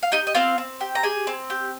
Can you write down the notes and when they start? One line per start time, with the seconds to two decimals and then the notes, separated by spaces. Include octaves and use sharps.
0.03 F5
0.12 D#4 G4 D#5
0.27 D#5
0.35 C4 F4 F5
0.58 C4
0.81 G4
0.95 A#5
1.03 G4 G#4 G#5
1.27 C4
1.50 G4